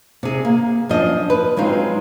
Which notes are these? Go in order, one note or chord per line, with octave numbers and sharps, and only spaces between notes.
C3 G#4
A#3
F#2 F3 D4 D#5
B4
F#3 G#3 C4 D#4 F4